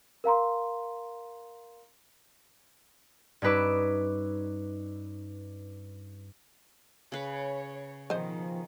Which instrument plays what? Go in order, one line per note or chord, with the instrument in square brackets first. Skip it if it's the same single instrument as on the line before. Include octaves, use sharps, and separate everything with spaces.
[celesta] A#4 F5 A#5 C6
[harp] G2 C#4 D#4 B4 D6 E6
[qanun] C#3 B4 [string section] C#5
[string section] B2 D#3 [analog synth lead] F3 [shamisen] C5 D#5